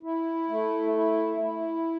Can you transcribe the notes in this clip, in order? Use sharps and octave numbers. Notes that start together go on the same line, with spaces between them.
E4
A3
E4
E4